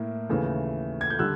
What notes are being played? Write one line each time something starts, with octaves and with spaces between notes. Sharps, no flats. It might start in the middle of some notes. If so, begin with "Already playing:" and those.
Already playing: A2 A#3
D#2 C#3 E3 A3
G#6
G6
D3 G3 E6 F#6